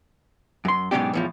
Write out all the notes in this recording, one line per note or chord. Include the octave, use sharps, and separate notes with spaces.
F#2 C6
G#2 B2 F#3 C#4 D4 G4
E2 A2 F3